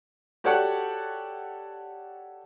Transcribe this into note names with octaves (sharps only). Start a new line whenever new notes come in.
F#4 G4 A4 C#5 D5 F#5